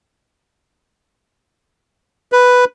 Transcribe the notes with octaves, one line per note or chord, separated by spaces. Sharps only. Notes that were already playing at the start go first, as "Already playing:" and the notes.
B4